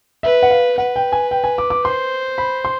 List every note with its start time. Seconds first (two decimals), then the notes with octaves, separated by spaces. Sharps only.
0.23 B4 E5
0.43 F#5
0.50 F5
0.78 B4 F#5
0.96 G5
1.12 G#5
1.31 G5
1.44 G#5
1.58 D6
1.70 D6
1.84 C5 C6
2.38 B5
2.65 C6